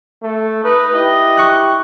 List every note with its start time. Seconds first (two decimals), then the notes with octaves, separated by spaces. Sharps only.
0.23 A3
0.64 D#4 B4
0.94 E4 G4 D#5
1.37 C#6 F#6